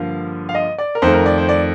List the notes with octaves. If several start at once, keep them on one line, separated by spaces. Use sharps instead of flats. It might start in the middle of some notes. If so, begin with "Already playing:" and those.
Already playing: G2 D3 F3 A#3 F5
F5
D#5
D5
A#4
F2 D#3 A3 C5
A#4
D5
C5
D5